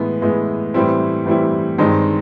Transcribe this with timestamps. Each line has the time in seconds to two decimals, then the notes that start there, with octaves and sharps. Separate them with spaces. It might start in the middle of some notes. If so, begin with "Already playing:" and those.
Already playing: A2 E3 G#3 B3
0.22 A2 E3 G#3 B3
0.74 A2 E3 G3 C4 E4
1.26 A2 E3 G3 C4 E4
1.78 G2 D#3 G#3 C4 D#4